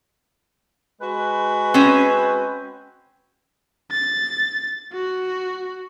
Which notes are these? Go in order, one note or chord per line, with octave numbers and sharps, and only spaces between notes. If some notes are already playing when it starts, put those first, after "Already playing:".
G#3 F#4 B4
C4 C#4
A6
F#4